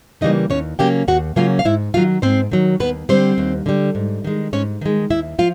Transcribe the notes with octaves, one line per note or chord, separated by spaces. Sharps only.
C#3 E3 G3 A#3 D#4 D#5
D#2 C#4 C#5
C#3 F#3 A#3 C#4 G4 G5
D#2 F#4 F#5
C#3 F#3 A#3 C#4 F4 F5
F5
G#2 E4 E5
D#3 F#3 F4 F5
G#2 C4 C5
D#3 F#3
D#2 B3 B4
D3 G3 C4 C5
D#2
D3 G3
G#2
D#3 G#3
G#2 C#4 C#5
D#3 G#3
D#2 E4 E5
F3 F4 F5